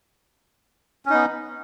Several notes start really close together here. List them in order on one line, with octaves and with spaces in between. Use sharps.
C#4 D#4 B3